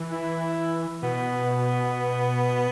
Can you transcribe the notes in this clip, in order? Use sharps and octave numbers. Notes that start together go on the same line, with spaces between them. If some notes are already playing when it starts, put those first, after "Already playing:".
Already playing: E3
E4
B2 B3